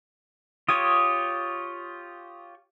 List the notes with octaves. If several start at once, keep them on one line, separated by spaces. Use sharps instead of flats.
F4 G4 C#5 D#6